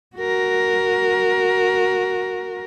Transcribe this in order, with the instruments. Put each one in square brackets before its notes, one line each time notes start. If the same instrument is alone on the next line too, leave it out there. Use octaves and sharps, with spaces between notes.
[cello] F#4 A#4